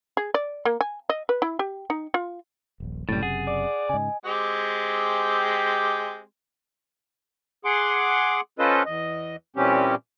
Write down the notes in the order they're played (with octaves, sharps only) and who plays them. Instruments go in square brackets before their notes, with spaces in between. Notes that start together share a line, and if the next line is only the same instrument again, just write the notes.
[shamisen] G#4
D5
A#3
G#5
D#5
B4
E4
G4
D#4
F4
[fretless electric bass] D#1 A#1
[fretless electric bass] F#1 F#2 C3 [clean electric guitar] A2 G3 [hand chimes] A6
[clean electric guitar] G#4 [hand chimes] F#5
[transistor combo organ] D5
[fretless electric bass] G#2 C#3 [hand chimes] D#5 G#5
[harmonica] G#3 C4 G4
[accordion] G#4 F#5 C6 D6
C#4 F4 A4 B4 C5 D#5
E2 D#5
A#2 E3 G3 C4 C#4 G4